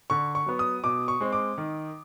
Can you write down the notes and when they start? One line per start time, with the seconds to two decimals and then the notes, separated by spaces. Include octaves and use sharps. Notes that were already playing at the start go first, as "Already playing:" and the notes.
0.10 D3 C#6
0.35 C#6
0.46 F#3 B3
0.59 D#6
0.84 B2 D6
1.08 C#6
1.21 G#3 C4
1.33 D6
1.58 D#3